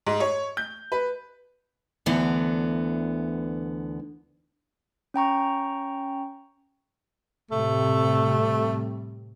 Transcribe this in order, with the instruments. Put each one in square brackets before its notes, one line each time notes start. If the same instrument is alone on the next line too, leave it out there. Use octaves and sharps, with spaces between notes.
[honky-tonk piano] G#2
C#5
G6
B4
[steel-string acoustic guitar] D2 D3 E3 B3
[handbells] C#4 G5 A#5 C#6
[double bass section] A2 C3 G3 [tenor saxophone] A3